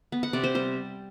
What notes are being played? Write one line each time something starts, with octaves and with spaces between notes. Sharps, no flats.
B3
F#5
C3 D5
C5
G3 C5